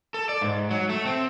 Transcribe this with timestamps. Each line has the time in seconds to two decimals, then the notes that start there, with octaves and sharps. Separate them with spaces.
0.14 A4
0.29 D5
0.41 G#2
0.70 F#3
0.89 A3
1.05 C4